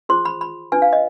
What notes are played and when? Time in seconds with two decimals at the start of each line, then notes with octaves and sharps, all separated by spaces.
0.09 F4 G#4 C5 C6
0.25 B5
0.41 B5
0.72 D4 F4 B4 G#5
0.82 F5
0.93 D#5